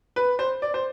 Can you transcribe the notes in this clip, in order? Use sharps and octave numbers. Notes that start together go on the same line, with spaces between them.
B4
C5
D5
C5